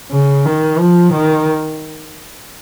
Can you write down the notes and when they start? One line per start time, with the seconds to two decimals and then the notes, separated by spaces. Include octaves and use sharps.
0.11 C#3
0.46 D#3
0.79 F3
1.13 D#3